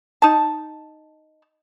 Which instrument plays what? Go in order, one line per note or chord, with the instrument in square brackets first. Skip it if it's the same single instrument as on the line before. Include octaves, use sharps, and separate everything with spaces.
[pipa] D#4 A5